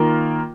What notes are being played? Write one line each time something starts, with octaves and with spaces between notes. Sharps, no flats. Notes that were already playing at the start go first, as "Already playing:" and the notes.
Already playing: D#3 A#3 F4 A#4